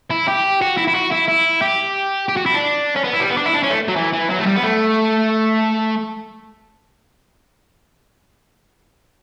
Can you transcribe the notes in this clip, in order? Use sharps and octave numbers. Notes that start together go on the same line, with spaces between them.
E4
G4
F#4
E4
E4
F#4
E4
E4
G4
G4
F#4
E4
D4
C#4
B3
E4
G3
B3
D4
E4
D4
C#4
A3
F#3
E3
E3
F#3
A3
G3
B3
A3